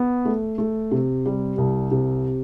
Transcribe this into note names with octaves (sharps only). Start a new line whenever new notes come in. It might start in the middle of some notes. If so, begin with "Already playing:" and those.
Already playing: B3
A3
A3
C3
G3
C2
C3